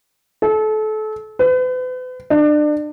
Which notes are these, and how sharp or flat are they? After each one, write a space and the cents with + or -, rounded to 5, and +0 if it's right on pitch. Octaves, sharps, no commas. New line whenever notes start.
A4 -30
B4 +40
D4 +30